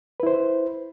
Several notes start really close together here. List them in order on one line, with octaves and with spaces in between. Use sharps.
B4 E4 C5